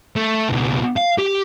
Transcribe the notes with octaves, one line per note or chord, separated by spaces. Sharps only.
A3
C#2 B2
F5
G4